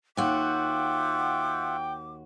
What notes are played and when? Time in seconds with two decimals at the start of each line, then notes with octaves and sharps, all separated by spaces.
0.17 D#2 F4 F#4 E5 F#5 G5 D6